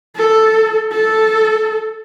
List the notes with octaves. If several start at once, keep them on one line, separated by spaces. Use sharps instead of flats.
A4
A4